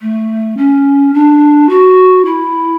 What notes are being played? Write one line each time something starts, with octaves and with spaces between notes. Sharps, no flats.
A3
C#4
D4
F#4
E4